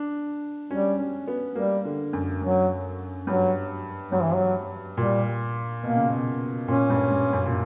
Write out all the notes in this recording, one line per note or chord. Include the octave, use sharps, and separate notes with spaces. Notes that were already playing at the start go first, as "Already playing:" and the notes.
Already playing: D4
G3 C#4
C#4
B3
G3 A#3
D3
F#2
F#2 F#3
G2 F#3
G2 F#3
E3
F#3
A#2 G3
B2 A#3
C#3
B2
A#2 C#4
G2
G2
F#2
A#2